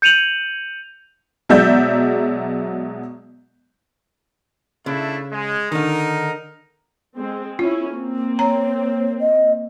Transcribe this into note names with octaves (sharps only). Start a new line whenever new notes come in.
G6 C#7 D#7 F7 F#7
B2 F#3 G#3 D5 E5 G6
C#3 A3 D4 E4
G#3
D3 D#3 D#4 A#4
G#3 C4
C#4 E4 F4
A#3 C4
C#5 A#5
D#5